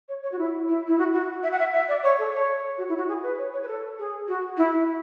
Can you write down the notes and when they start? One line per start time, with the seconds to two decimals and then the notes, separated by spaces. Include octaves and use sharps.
0.09 C#5
0.23 C#5
0.32 F#4
0.39 E4
0.68 E4
0.87 E4
0.99 F#4
1.14 F#4
1.43 E5
1.52 F#5
1.59 E5
1.73 E5
1.88 D5
2.03 C#5
2.19 A4
2.33 C#5
2.78 F#4
2.89 E4
2.98 F#4
3.08 G#4
3.23 B4
3.38 C#5
3.53 C#5
3.63 B4
3.68 A4
3.99 G#4
4.28 F#4
4.57 E4